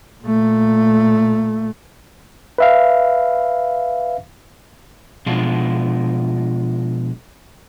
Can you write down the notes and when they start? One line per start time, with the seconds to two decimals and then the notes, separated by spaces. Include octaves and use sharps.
0.23 A#2 A3
2.58 B4 E5 F5
5.26 B2 F3 G#3 D4 F4